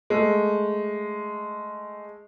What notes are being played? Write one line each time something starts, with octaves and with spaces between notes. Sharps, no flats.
G#3 A3